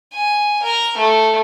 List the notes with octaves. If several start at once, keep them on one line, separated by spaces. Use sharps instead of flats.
G#5
A#4
A3